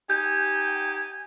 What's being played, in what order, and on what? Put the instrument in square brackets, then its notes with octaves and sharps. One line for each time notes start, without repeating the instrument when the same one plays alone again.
[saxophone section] D#4 G4 [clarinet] G#5 [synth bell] G6